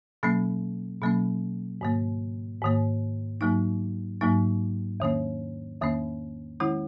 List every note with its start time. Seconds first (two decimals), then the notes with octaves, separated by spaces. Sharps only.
0.23 B2 F#3 A#3 C#4
1.02 B2 F#3 A#3 C#4
1.81 G#2 D#3 A#3
2.62 G#2 D#3 A#3
3.41 G#2 F#3 A#3 D#4
4.21 G#2 F#3 A#3 D#4
5.00 E2 D#3 A#3 C#4
5.81 E2 D#3 A#3 C#4
6.60 D#3 G#3 C#4 E4